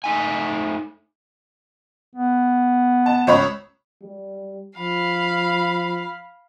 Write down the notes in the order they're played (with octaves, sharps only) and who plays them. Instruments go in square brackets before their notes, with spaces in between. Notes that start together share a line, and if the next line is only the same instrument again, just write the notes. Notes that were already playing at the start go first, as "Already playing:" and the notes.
[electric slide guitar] A3 D#4 G#5
[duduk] B3
[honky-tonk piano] A5
C#2 C#5 B5
[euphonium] G3
[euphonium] F3 [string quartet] F5 B5